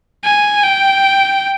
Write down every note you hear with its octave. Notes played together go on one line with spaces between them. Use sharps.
G#5
G5